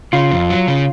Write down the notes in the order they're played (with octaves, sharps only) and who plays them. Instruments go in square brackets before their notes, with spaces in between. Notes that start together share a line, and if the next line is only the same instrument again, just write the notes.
[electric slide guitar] C#3 [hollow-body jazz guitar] F4
[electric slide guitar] F2
F#3
C#3